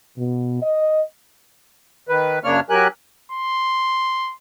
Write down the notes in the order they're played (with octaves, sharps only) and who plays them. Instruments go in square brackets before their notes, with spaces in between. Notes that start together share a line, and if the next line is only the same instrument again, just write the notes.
[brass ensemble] B2
D#5
[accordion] D#3 B4
F#2 C#3 A#3 D4 C#5 F6
F#3 G4 A#4 G#5 F#6
[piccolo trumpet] C6